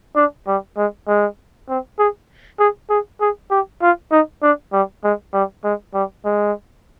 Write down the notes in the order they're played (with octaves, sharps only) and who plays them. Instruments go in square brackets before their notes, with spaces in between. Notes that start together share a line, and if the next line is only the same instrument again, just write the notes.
[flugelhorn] D4
G3
G#3
G#3
C4
G#4
G#4
G#4
G#4
G4
F4
D#4
D4
G3
G#3
G3
G#3
G3
G#3